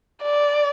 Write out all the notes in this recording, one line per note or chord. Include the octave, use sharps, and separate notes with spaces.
D5